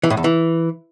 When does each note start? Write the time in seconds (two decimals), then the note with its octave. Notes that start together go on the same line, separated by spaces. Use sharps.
0.03 E3
0.10 A2
0.17 E2
0.24 E3